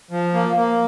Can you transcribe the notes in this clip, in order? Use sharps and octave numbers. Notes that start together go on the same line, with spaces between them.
F3
A#3
A#3